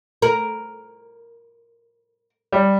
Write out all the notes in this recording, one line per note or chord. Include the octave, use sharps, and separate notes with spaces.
A#4
G3